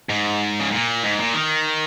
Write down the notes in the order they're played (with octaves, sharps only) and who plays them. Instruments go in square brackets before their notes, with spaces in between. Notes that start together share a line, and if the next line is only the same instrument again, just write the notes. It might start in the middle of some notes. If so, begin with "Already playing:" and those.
[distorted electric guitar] G#2
C#3
A#2
G#2
A#2
D#3